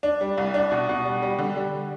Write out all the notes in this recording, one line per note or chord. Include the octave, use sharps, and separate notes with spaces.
D4
G3
C2
D4
B2
B2
G3
G3
D3
G3